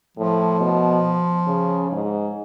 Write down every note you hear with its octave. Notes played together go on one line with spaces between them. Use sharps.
A2 F3
B2
C#3
G#2